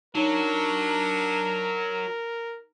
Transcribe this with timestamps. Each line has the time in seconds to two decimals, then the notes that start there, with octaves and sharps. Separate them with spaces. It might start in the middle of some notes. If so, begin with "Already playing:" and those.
0.15 F#3 D4 D#4 A#4 C#5